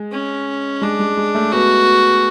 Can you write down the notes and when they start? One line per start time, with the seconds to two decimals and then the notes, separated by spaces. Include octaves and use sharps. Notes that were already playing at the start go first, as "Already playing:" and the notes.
Already playing: G#3
0.12 C#4
0.82 G#3 D4
1.00 G#3
1.17 G#3
1.35 A3
1.52 B3 F#4